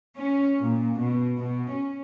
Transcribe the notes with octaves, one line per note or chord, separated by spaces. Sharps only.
C#4
A#2
B2
B2
C#4